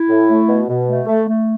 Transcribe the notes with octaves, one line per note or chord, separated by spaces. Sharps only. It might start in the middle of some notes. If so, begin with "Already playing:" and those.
Already playing: E4
A2
A3
B2
B2
A3
A3
A3